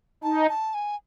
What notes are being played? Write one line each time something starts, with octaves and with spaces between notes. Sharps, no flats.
D#4 A5
A5
G#5